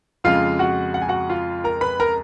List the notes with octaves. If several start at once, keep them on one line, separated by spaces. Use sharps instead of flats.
F2 C#3 G#3 F4 F5
F#4 F#5
F#5
G#5
F#4 F#5
F4 F5
A#4 A#5
B4 B5
A#4 A#5